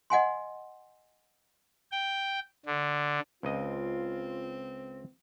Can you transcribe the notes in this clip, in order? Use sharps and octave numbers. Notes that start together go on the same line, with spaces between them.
D#5 F#5 G#5 C6
G5
D3
C#2 C4 F4 D#5